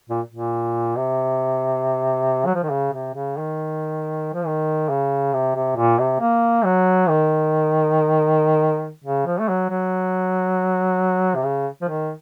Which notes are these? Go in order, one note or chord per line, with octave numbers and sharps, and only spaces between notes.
A#2
A#2
C3
F#3
F3
D#3
C#3
C3
C#3
D#3
F3
D#3
C#3
C3
C3
A#2
C3
A#3
F#3
D#3
C#3
F3
A3
F#3
F#3
C3
C#3
F3
D#3